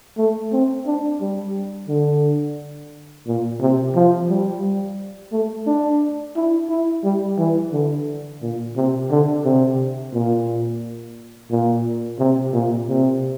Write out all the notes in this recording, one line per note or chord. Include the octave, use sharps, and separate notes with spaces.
A3
C4
D4
G3
D3
A#2
C3
F3
G3
A3
D4
E4
E4
G3
E3
D3
A#2
C3
D3
C3
A#2
A#2
C3
A#2
C3